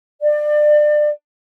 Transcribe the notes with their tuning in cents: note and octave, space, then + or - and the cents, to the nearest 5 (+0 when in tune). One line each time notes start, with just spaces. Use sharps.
D5 +30